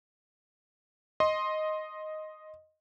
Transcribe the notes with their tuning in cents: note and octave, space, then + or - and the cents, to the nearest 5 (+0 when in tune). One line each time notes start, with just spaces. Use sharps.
D#5 +0 C6 +10